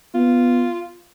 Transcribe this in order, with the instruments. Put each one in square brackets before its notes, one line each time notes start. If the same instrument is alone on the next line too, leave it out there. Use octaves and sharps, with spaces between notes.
[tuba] B3 [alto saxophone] F4